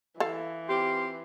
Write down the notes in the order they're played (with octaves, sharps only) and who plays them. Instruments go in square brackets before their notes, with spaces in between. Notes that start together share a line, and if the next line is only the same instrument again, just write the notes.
[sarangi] E3 [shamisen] A4 F5
[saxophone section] C4 F4 G4 [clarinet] C6